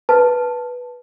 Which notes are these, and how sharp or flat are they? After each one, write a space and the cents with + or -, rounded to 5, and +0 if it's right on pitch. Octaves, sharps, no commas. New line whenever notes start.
B4 -10 A5 +0